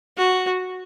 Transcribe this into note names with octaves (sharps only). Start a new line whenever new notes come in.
F#4